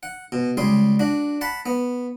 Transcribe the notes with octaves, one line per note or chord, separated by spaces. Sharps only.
F#5
B2
C#2 G3 G#4 C6
D4 F#4
F#5 A5 B5
B3